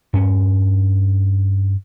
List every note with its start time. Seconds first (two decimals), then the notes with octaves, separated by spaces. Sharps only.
0.13 G2 C#4